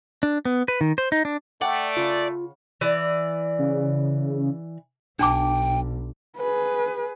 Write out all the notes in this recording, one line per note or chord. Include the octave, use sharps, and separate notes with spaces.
D4
B3
B4
D#3
C5
D#4
D4
A3 D5 F#5 G5
C#3 F4
E3 D5
C#3
B1 D4 G5 A5 D6
G#4 B4